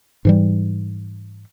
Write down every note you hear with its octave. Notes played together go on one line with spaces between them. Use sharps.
G#2 E3 G3